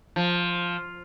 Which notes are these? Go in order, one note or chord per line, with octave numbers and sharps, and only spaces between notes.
F3